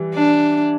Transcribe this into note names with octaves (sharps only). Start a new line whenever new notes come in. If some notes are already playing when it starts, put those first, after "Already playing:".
Already playing: E3 G3
D4